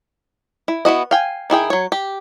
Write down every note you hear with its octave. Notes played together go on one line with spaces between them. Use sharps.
E4
B3 E4 F#4 D#5
F5 G5 G#5
D#3 E4 G#4 G5
F#3 C#5
G4